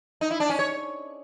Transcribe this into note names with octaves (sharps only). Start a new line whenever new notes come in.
D#4
E4
D4
C#4
C#5